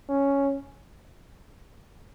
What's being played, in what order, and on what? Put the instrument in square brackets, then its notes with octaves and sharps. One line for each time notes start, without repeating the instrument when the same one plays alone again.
[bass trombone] C#4